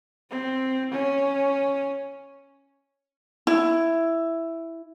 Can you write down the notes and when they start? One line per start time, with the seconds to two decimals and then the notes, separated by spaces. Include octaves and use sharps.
0.31 C4
0.91 C#4
3.47 E4